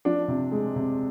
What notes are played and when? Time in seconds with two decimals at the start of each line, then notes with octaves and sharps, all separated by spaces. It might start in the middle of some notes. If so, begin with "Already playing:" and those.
0.05 F3 D4
0.28 C3
0.52 G#3
0.76 C3